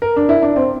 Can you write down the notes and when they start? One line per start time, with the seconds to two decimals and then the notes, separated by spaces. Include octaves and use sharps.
0.02 A#4
0.16 D4
0.29 E4
0.43 D4
0.56 C4